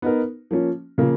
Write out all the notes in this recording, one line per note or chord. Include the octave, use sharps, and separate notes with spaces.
B3 D#4 A#4
F3 A#3 C#4
C#3 F3 A#3